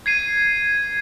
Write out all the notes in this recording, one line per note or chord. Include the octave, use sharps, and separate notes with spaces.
G#6 C7 D#7